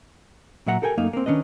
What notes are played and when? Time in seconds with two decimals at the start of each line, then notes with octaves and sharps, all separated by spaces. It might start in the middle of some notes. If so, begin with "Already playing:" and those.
0.66 A#2 F#3 E5 F#5 A#5
0.82 G4 A4 A#4 G5 G#5
0.98 F#2 A3 A#3 D#4
1.13 A#3 C4
1.26 D#3 C#4 D4 B4 D#5